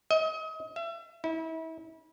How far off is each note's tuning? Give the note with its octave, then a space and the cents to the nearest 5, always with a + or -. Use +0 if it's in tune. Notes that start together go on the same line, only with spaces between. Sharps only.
D#5 +35
E5 +35
E4 -35